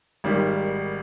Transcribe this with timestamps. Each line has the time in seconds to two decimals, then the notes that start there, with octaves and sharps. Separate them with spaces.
0.24 G#1 G#2 D#3 G3